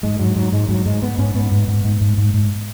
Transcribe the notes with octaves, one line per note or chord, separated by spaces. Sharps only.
G#2 G#3
G#2 F#3
G#2 F#3
G#2 G#3
G#2 F#3
G#2 G#3
G#2 B3
G#2 C#4
G#2 B3
G#2
G#2
G#2
G#2
G#2
G#2